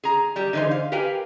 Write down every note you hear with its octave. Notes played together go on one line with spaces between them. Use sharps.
G#4 A#5
G3 G4
D3 E3 D#4 G#4 C5
F5
G4 A#4 B4 F5 G5 G#5